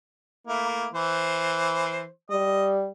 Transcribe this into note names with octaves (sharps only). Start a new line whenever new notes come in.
A3 A#3 E4
E3 C5
G3 D#5